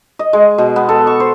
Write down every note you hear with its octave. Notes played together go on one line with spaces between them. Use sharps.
D#5
G#3
B2
B3
A4
C#6
C5